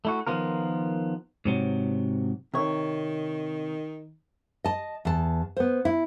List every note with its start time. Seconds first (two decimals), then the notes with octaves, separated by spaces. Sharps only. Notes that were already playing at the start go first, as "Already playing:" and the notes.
0.05 A3 E4 F#4
0.27 D#3 F3 B3 F4 A#4
1.45 G#2 C3 F#3
2.54 C3 D#3 C#5
4.64 D#5 A5
5.05 E2 A5
5.57 B3 C5
5.85 E4